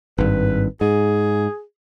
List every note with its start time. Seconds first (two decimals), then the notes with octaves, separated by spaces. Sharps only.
0.18 G#1 G2 B4
0.81 G#2 G#4